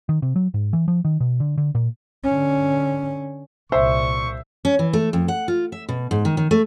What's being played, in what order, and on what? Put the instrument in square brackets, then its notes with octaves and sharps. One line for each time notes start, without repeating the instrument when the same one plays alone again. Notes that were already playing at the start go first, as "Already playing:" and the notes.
[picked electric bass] D#3
C3
F#3
G#2
E3
F3
D#3
B2
D3
D3
A#2
[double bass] D3 C#4
[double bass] C2 A#2 [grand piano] C5 [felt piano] E5 [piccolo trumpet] C#6
[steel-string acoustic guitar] C#4
E3
A3
F2
F#5
F4
E5
B2
G#2
D#3
D#3
A3